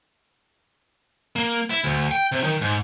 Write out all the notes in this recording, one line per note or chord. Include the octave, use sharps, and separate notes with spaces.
A#3
E4
D2
G5
C3
D#3
G#2